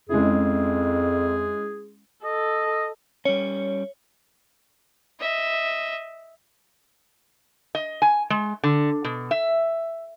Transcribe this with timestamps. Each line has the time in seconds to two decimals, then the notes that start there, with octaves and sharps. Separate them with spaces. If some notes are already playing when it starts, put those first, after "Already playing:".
0.09 F2 G#3 C#4 E4 G#4
2.25 A4 D#5
3.25 G3 C#4 C#5
5.19 D#5 E5
7.75 D#5
8.02 G#5
8.30 G#3
8.63 D3
9.04 B2
9.31 E5